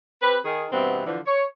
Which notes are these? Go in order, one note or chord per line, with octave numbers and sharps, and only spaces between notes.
C4 G4 B4
D#3 G#4
G2 B2 E3 B3 C4
D3 E3 F3
C#5